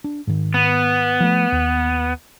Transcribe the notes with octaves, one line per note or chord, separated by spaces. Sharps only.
D4
G#2 D#3
B3
F3 A3
D#2